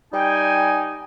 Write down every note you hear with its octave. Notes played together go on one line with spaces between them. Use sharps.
G3 D#4 G5 G#5